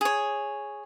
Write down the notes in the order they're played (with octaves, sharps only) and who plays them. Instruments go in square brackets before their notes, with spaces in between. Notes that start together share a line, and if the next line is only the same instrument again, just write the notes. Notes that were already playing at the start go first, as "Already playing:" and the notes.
[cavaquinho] G#4 C#5